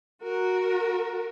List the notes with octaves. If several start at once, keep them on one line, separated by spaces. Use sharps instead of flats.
F#4 A#4